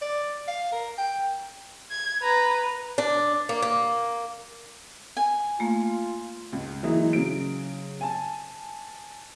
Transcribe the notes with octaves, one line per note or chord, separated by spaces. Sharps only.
D5
F5
A#4
G5
G#6
B4 A#5
D4
A#3
A#3
G#5
A3 A#3 F4
C#2
E3 F#3 G#3 A#3 D#4 E4
C#3 F#3 D7
G#5 A5